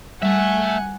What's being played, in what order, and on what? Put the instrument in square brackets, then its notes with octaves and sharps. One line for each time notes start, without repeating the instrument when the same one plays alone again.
[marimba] G3 [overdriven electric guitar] A3 E5 [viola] F#5 G#5